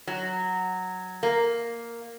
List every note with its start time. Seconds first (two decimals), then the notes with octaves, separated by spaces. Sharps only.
0.07 F#3
1.23 A#3